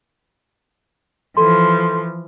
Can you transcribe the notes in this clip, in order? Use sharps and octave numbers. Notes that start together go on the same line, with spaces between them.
E3 F3 A4 C6